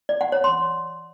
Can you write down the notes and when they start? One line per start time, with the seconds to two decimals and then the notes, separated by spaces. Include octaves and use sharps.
0.09 D5
0.21 F#5
0.32 C#5
0.44 C6